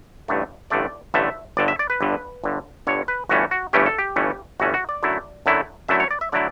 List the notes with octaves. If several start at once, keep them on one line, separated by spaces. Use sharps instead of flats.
A1 G2 D3 A3
A1 G2 D3 A3 D5
A1 G2 D3 A3 E5
G1 G2 D3 D5
E5
D5
B4
G1 G2 D3
G1 G2 D3
G1 G2 D3 C#5
B4
G1 G2 E3 A3 C#4 F#4
F#4
G1 G2 E3 A3 C#4 G4
A4
G4
G1 G2 E3 A3 C#4
G1 G2 E3 A3 C#4 F#4
F#4
D5
F#2 D3 F#3 A3 E4
F#2 D3 F#3 A3 E4
F#2 D3 F#3 A3 E4 E5
C#5
D5
E5
D3 F#3 A3 E4 D5